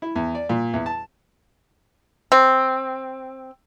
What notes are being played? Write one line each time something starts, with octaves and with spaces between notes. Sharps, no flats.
E4
E2
D5
A#2
E2
A5
C4